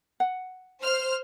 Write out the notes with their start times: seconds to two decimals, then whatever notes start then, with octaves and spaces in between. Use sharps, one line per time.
0.20 F#5
0.83 C5 F6